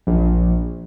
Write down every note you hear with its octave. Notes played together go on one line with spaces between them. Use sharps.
A#1